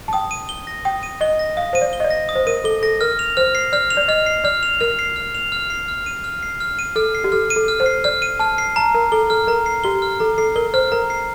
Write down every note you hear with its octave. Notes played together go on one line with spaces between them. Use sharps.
A5
G5 D#6
D#7
G7
A#6
G5 D#6
D#7
D#5 G7
A#6
F5 D#6
C5 D#7
D5
G7
D#5
D5
A#6
D#6
C5
A#4 D#7
A4 G7
A4 A#6
A#4 F6
F7
C5 F6
C7
D5 F6
F7
D5
D#5 F6
C7
D5 F6
F7
A#4 F6
C7
F6
F7
F6
C7
F6
D#7
F6
C7
F6
D#7
A4 F6
C7
G4
A4 F6
D#7
A4
F6
C5
C7
D5 F6
D#7
A5 F6
C7
A5 A#5
A#4 C7
A4 G7
A4 F6
A#4 A#5
C7
G4 G7
F6
A4 A#5
A4 C7
A#4 G7
C5 F6
A#4 A#5
C7